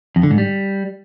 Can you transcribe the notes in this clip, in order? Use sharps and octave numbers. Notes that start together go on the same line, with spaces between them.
F2
D3
G#2
G3